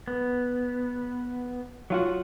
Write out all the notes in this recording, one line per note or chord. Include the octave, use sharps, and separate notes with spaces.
B3
F#3 F4 F#4